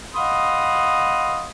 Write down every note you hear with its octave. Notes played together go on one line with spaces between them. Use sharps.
D#5 F5 F#5 B5 C6 D#6